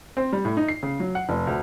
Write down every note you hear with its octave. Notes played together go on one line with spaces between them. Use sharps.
C4
G3
A2
D#4
C7
C#3
F#3
F#5
F1
D2